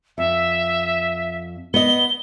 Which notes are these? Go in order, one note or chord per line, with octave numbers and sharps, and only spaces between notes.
F2 E5
B3 D#5 G7